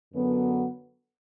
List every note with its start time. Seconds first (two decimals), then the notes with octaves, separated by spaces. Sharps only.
0.14 F#2 D3 F#3 B3